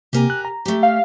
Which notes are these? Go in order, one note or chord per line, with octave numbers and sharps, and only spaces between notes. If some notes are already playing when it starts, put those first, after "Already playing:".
C3 A#3 G4 A#4 G#5
F#6
A#5
A3 G4
F5